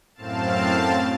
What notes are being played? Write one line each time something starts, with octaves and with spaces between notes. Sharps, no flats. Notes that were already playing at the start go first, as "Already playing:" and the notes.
F#2 A2 C4 F5 A5